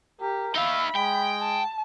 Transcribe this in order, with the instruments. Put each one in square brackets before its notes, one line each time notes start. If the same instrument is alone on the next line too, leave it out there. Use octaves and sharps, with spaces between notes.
[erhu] G4 [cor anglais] A#4
[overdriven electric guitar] D#4 F5 [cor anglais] E5 [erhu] B5
[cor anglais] G#3 [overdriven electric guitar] G5
[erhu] A5